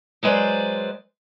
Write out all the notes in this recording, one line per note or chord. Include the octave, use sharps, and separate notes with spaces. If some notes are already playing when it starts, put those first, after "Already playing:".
F#3 G#3 B4 C5 D5